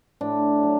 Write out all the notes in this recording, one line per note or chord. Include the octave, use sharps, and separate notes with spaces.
A2 D4
F#3